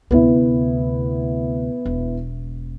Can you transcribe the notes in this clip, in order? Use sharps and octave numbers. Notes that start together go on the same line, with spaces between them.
D2 C3 B3 E4
E1